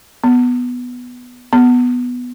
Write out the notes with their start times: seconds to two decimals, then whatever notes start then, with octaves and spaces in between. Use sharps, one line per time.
0.24 B3
1.53 B3